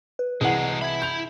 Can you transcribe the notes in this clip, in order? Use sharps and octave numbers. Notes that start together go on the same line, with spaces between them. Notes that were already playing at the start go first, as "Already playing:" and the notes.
B4
C2 E3 F#3 G#3 G#4 F#5 F#7
E4 E5 B5 G#6
G6 F7